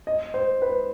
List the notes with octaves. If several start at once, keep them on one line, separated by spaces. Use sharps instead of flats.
D#5
C5
B4